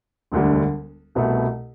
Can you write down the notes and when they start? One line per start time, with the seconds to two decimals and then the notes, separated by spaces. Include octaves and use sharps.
0.32 E1 D2 D3 G3
1.15 C2 B2 A3